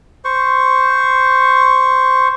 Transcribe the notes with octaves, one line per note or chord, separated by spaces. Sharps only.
C5 C#6